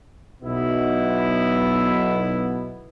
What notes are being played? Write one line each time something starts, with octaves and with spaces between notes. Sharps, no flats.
B1 B2 B3 E4